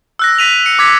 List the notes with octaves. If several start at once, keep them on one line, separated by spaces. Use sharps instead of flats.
E6 F#6 A#6
B6 D#7 F7
C#7
D6 G#6 B6